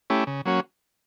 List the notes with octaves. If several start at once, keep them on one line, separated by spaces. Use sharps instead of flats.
A3 C#4 E4 G4
C#3
F#3 A#3 C#4 F#4